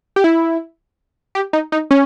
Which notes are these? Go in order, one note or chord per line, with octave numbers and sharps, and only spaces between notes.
G4
E4
G4
D#4
D#4
C#4